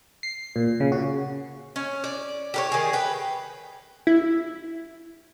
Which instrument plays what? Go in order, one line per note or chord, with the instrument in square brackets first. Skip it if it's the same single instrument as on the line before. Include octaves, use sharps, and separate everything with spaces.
[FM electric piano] C7
A#2
C#3
F#4
[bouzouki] C#4
D5
G4 A#4 C#5
D#3 G#4
B4 G5
[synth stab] E4